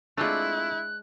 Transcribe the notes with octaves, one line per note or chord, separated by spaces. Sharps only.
G#3 A3 C4 D4 E4 F4 F#6